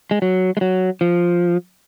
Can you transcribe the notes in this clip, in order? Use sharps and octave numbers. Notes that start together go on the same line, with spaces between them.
G#3
F#3
G#3
F#3
F3